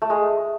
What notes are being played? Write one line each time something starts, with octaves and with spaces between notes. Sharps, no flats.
A3
G#3